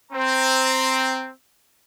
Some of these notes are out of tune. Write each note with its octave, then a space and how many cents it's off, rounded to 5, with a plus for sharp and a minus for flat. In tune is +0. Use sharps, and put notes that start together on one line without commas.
C4 +0 A#5 -10